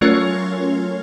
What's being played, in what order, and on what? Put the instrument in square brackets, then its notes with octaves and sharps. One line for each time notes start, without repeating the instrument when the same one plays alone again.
[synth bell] F#3 A3 C#4 F4 A#4 C#5